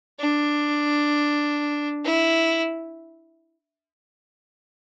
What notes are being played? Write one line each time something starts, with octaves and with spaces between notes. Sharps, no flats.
D4
E4